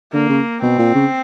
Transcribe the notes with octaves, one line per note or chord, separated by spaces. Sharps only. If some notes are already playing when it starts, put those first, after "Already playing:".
D3 A#3
C#3
B2 C4
A#2
C#3